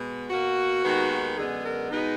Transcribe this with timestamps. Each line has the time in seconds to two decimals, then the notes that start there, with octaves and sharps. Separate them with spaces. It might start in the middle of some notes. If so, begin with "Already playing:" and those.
Already playing: B2 G#3 B3
0.31 B2 A#3 F#4
0.84 D#2 D#3 G#3 B3
1.38 F#2 D3 G#3 B3 G#4
1.65 A#4
1.91 B2 G#3 B3 D#4